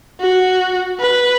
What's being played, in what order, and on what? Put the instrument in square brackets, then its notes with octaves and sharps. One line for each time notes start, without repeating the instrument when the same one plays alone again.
[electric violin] F#4
B4